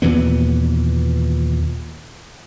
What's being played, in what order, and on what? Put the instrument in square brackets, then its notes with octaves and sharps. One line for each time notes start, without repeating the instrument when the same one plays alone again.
[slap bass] D#2 A#2 E3 B3